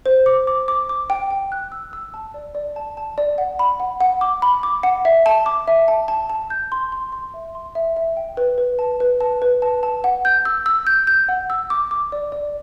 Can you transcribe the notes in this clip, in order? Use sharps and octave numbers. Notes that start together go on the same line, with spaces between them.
C5
D6
D6
D6
D6
G5
G5
F#6
E6
E6
A5
D5
D5
A5
A5
D5
F#5
B5
F#5
F#5
D6
B5
D6
F#5
E5
A5
D6
E5
A5
A5
A5
G6
C6
C6
C6
E5
C6
E5
E5
G5
B4
B4
A5
B4
A5
B4
A5
A5
F#5
G6
E6
E6
G6
G6
F#5
E6
D6
D6
D5
D5